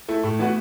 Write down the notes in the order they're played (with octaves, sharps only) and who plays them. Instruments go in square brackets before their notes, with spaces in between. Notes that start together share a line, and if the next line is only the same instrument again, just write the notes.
[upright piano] A3 E4
[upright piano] A2 [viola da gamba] A3
[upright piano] E3 B3 F#4